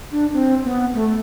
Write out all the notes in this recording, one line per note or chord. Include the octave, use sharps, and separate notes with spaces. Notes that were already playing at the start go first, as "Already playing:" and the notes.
D4
C4
B3
A3